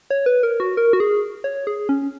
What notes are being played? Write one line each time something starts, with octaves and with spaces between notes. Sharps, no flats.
C#5
B4
A#4
F#4
A#4
F#4
G#4
C#5
G#4
C#4